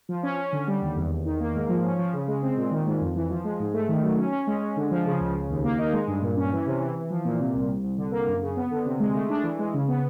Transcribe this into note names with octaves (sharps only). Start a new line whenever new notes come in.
F3
C#4
C#4
D3
G3
D#2
E2
E2
D#3
A#3
G#2
F3
C#4
F3
C#3
G#3
C4
A#2
D#3
G#2
F2
E3
F3
G#3
G#2
A3
D#3
F#3
C#4
C#4
G#3
G#3
D3
F3
C#3
C#2
C#3
D#2
A#3
D#4
G#3
G2
A#2
C#4
E3
C3
E3
E3
F3
A#2
C3
C2
C2
C2
D3
A#3
F#2
C#3
B3
D3
C3
G#3
A3
D4
E3
G#3
C#3
B3